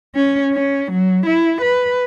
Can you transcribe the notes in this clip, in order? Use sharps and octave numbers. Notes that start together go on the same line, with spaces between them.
C#4
C#4
F#3
E4
B4